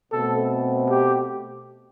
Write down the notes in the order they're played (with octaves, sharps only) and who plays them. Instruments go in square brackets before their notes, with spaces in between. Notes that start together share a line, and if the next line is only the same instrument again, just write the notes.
[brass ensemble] B2 A3 C4 [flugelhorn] A4
[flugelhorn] G4